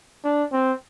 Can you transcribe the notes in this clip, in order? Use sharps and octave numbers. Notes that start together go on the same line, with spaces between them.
D4
C4